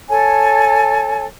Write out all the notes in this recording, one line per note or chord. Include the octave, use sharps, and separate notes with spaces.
A4 C#5 G#5 A5